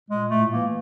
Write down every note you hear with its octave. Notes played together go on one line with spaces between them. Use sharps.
A#2 G#3
A2 A3
E3 A#3